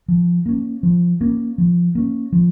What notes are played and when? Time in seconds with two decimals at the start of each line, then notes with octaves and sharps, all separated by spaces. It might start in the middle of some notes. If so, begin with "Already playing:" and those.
0.08 F3
0.46 A#3 C#4
0.83 F3
1.21 A#3 C#4
1.58 F3
1.95 A#3 C#4
2.32 F3